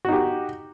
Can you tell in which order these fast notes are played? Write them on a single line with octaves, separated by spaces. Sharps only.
F#4 D#4 G4